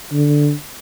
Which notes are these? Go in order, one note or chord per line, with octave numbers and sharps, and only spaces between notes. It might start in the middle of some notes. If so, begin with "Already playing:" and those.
D3